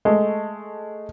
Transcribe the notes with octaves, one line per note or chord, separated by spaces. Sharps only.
G#3 A3